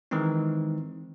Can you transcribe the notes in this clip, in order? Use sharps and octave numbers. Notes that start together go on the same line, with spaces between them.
D#3 E3 G#3 C4 D#4